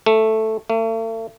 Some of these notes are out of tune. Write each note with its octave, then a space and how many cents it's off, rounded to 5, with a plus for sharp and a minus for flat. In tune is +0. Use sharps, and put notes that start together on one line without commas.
A3 +0
A3 +40